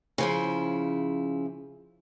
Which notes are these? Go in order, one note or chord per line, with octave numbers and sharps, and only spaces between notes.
C#3 F3 E4